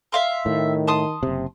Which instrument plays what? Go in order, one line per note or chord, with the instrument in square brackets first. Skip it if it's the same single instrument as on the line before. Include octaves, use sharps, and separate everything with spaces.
[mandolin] E5 F5 C6
[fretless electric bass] A2 [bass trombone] D#3
[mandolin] A5 C6 D#6
[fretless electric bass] F#1 C3